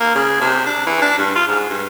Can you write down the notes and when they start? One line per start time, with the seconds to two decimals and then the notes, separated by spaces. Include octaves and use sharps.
0.01 A#3
0.15 C#3
0.41 C3
0.66 D4
0.87 E3
1.02 D4
1.18 G2
1.36 F4
1.48 G#2
1.70 G2